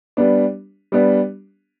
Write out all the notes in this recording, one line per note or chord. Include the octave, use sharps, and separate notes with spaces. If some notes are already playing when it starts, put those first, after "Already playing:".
G3 B3 D4
G3 B3 D4